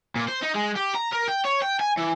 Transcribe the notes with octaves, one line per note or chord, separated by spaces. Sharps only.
A#2
C5
D#4
G#3
G4
A#5
A#4
G5
C#5
G5
G#5
E3